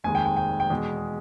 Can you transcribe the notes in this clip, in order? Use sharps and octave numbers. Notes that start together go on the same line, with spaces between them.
F1 D#2 D#3 G#3 G#5
G5
G5
G5
G5
E2 B2 G#3